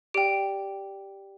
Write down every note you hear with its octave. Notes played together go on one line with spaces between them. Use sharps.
G4 D5 G5 D7